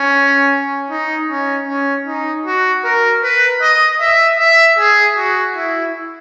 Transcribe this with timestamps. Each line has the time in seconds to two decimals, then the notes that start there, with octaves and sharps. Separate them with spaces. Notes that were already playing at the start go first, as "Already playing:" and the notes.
Already playing: C#4
0.90 D#4
1.29 C#4
1.68 C#4
2.07 D#4
2.46 F#4
2.84 A#4
3.23 B4
3.62 D#5
4.01 E5
4.39 E5
4.79 G#4
5.17 F#4
5.56 E4